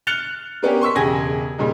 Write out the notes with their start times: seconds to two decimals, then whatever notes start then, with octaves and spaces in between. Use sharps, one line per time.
0.07 F6 F#6 A6 C#7 F7 G7
0.62 A#3 B3 C#4 G4 D5
0.81 C6 C#6 E6 B6
0.95 E1 C#3 G4 G#5 G#6 A#6
1.58 A#2 C#3 G3 D#4